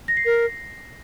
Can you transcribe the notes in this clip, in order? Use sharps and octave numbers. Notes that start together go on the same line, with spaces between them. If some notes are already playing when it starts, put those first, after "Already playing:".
A#6
C7
A#4